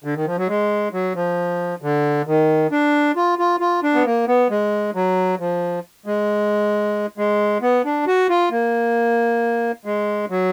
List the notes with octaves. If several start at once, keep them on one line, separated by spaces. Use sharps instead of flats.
D3
D#3
F3
F#3
G#3
F#3
F3
D3
D#3
D4
F4
F4
F4
D4
B3
A#3
B3
G#3
F#3
F3
G#3
G#3
B3
D4
F#4
F4
A#3
G#3
F#3